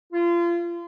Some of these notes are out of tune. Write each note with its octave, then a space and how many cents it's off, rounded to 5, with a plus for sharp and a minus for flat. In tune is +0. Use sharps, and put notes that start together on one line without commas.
F4 -30